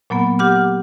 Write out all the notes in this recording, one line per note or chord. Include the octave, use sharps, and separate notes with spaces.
A#2 F#3 A#3 B3
G4 F#5 D6 F6